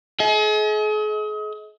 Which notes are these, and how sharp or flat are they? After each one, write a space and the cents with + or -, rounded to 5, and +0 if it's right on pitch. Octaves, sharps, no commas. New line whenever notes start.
G#4 +40 D#5 +40